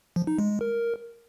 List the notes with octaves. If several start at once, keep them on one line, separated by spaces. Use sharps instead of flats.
F3
D#4
G#3
G#3
A#4